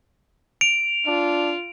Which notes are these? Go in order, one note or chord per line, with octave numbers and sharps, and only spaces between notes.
D7 F7
D4 F4